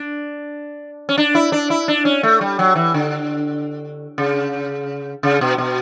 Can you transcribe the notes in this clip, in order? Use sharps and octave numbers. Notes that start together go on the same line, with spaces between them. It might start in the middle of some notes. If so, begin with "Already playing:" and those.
Already playing: D4
C#4
D4
E4
D4
E4
D4
C#4
A3
G3
F#3
E3
D3
C#3
C#3
B2
B2